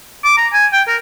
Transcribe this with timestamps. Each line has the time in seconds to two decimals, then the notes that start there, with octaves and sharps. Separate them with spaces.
0.25 D6
0.38 A#5
0.53 G#5
0.73 G5
0.88 A#4